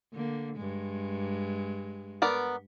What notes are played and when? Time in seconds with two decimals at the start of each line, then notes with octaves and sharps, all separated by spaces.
0.13 D3 A#3
0.56 G2 G#3
2.22 B3 A#4 D5